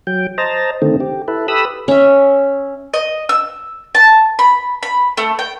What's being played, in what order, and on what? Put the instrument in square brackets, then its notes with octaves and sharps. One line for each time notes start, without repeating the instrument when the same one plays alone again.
[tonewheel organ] F#3 G5
C5 D#5 A5 A#5
D3 D#3 A3 C4
G4
E4 A4 B4
G4 A4 B4 B5 D#6 E6
[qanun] C#4 E5
[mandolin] D#5
E6
A5
B5
B5
A3
G5